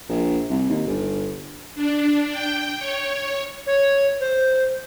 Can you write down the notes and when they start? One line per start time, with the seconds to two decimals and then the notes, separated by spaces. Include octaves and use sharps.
0.09 A#1
0.50 C2
0.69 D#2
0.87 G1
1.75 D4
2.31 G5
2.78 C#5
3.66 C#5
4.20 C5